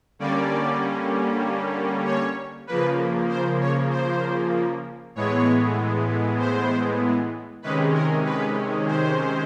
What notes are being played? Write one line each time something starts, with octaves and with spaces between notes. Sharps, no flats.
D3 G3 A#3 C#4 D5
C#5
C#3 F3 A#3 B4
C5
C#5
C5
A2 E3 G#3 B3 C#5
C5
C3 D#3 G#3 C#4 B4
A#4
B4
C5